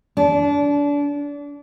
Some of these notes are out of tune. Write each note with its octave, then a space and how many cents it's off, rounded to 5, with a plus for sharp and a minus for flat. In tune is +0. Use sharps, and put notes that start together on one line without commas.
D4 -30